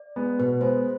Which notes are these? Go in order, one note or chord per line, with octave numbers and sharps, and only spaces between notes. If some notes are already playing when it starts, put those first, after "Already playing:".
Already playing: D5
G#3 B3
B2 B4
G#3 B3 C5